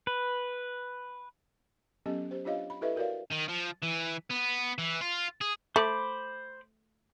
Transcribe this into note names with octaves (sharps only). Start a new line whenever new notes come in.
B4
F#3 B3 C#4 G4 A4 D#5
G4 C5
D4 F4 G4 C#5 D#5 F5
B5
E4 G4 A4 B4 D#5 E5
F#4 A#4 C#5 D5 F5
D#3
F3
E3
B3
E3
F4
G#4
A3 C5 B5 D6